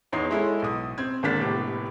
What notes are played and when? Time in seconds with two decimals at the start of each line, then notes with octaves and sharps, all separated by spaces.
0.12 E2 D#4 C#5 C6 C7
0.31 G#3 E4 A4 C#5
0.62 B1 D#6
0.98 C4 G#6
1.23 G#1 D3 A#3 D4 A6 B6
1.40 F1 A2 B3 G4